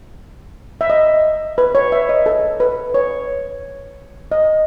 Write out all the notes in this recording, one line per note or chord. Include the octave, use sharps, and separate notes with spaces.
E5
D#5
B4
C#5
E5
D#5
A4
B4
C#5
D#5